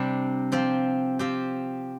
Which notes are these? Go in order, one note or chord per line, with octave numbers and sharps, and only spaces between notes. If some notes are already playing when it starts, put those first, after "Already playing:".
Already playing: C3 G3 D4
F3 C4 G4
F3 C4 G4